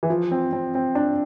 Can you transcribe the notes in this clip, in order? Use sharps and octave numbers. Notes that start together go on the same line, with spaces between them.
E3
F3
C4
C4
C4
D4